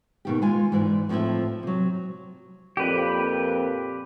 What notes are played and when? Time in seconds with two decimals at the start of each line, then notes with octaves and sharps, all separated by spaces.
0.25 B2 D#3 G4
0.42 G#3 F4 G#5
0.72 G#2 E3 D5
1.09 A2 F3 C4 E4 E5
1.63 C3 F#3
2.77 F2 A#2 G4 B4